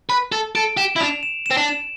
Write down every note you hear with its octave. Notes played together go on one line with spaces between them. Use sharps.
B4
A4
A4 D7
G4 E7
E4
D4 F7
E7
E7
C4
D4
E7